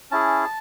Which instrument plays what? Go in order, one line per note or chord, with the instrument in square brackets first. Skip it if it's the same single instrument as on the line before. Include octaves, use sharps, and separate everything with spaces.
[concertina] C#4 E4 G#4 A5